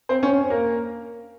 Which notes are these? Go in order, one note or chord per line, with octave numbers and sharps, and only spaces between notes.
C4 C5
C#4 C#5
A#3 A#4